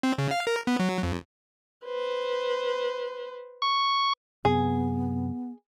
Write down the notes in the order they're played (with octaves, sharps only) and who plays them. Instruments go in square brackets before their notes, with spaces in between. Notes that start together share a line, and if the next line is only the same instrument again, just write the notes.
[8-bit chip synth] C4
C#3
F5
A#4
B3
F#3
F2
[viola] B4 C5
[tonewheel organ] C#6
[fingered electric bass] F#2 C3 [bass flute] B3 [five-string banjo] G#4